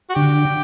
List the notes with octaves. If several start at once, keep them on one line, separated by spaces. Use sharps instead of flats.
F#4
D3 G4